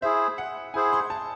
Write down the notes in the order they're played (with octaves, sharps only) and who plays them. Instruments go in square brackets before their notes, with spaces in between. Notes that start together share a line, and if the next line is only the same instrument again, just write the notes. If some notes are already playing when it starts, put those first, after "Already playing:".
[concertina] E4 G#4 C5 [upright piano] E5
[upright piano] F#5
[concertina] E4 G#4 C5 [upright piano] G#5
[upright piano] C6
A5